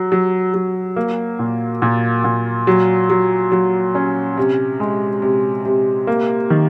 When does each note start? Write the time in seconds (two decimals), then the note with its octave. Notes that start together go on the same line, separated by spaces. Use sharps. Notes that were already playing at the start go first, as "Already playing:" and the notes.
Already playing: F#3
0.12 F#3
0.54 F#3
0.96 A#3
1.39 A#2
1.82 A#2
2.24 A#2
2.67 F#3
3.10 F#3
3.52 F#3
3.95 C#4
4.37 C3
4.80 G#3
5.22 C3
5.65 C3
6.07 A#3
6.50 D#3